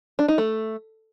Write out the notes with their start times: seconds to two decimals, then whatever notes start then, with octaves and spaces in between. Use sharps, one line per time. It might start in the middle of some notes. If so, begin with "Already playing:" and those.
0.19 D4
0.28 D#4
0.38 A3